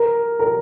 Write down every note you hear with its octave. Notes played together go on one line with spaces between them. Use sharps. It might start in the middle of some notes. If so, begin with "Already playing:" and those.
Already playing: A#4
A#4